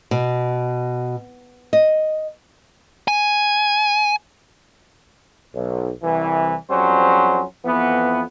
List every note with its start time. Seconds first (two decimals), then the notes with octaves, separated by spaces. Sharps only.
0.11 B2
1.73 D#5
3.08 G#5
5.55 B1
6.04 C2 E3
6.71 F2 F#3 G3 C#4 C5
7.65 F2 E3 B3